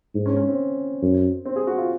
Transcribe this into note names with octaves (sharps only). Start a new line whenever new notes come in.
G#2
C#4
C#4
C4
F#2
C4
G#4
F#4
F4